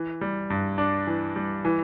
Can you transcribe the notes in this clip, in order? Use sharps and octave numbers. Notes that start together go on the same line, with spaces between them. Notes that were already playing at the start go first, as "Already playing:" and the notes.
Already playing: E3
G3
G2
D4
E3
G3
E3